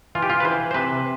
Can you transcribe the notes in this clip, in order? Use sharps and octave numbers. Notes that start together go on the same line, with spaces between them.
E3 F4
G4
F4
B4
E3 C5
C5
C3 B4